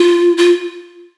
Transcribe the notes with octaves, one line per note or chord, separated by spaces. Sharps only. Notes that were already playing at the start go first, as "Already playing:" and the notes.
Already playing: F4
F4